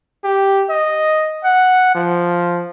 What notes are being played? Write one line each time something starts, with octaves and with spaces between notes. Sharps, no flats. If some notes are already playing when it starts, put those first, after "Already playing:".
G4
D#5
F#5
F3